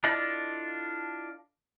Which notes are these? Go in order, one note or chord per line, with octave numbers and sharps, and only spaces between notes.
D4 E4 F4 A4 D5 D#5